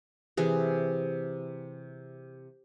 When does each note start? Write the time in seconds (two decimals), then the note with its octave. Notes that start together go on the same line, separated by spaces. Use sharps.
0.37 C3 E3 G#4